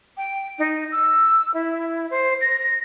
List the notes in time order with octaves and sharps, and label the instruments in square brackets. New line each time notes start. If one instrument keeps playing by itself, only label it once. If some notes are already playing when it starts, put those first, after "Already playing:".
[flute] G5
D#4
E6
E4
C5
A#6